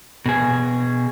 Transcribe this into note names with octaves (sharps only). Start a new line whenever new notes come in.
B2 G#4